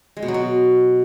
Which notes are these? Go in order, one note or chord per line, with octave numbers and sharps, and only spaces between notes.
G#3
B2
F#3
B2